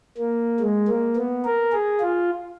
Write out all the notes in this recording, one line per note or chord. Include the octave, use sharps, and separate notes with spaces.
A#3
G#3
A#3
B3
A#4
G#4
F4